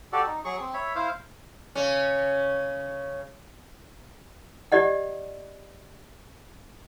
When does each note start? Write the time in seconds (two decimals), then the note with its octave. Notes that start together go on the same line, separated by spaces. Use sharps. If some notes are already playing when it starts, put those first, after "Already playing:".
0.13 F#4 G4 A4 D5
0.27 D#4
0.45 F#3 G#4 C#6
0.60 C4
0.74 C#5 E5 B5
0.95 E4 C5 F5
1.75 C#3 C#4
4.72 G4 D5 D#5 F#5